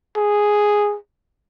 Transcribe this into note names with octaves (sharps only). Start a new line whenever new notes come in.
G#4